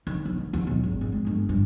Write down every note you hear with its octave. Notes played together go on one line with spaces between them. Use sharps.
D#2
B1
D#3
D#2
B1
G#1
G#1
G#3
G1
G2